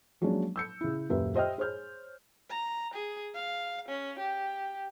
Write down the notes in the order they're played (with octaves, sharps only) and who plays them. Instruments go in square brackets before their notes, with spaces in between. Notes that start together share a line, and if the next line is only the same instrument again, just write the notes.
[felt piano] F3 F#3 G#3 A#3 C#4 D4
E6 G6 C#7
C#3 E4
D#1 F#2 A#3 G4 B4 E5
G4 C5 D#5 E5 G5 F6
G#4 C5 C#5 F6 G6
[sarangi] A#5
G#4
F5
C#4
G4